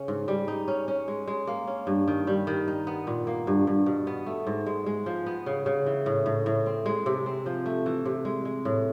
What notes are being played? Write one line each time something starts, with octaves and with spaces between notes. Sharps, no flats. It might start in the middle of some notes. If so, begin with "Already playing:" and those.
Already playing: C#3 C#4
G#2
G3
D#4
C#4
C#4
G#3
G#3
A#3
C#4
G2
D#3
G3
D#3
D#4
B3
A#2
A#3
G2
G2
B2
B3
A3
G#2
G#3
G#3
F3
B3
C#3
C#3
E3
A2
A2
A2
C4
G#3
C3
C4
F3
A3
E3
C3
G#3
G#3
A2